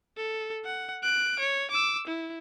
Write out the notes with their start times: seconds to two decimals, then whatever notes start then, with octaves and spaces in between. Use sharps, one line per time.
0.17 A4
0.65 F#5
1.03 F#6 D7
1.39 C#5
1.71 D6 E6
2.07 E4